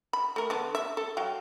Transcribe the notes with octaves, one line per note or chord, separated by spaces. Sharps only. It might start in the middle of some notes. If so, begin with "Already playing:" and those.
B5
A3 A#4
D3 B3 D4
E5
A4
F#3 F5 G5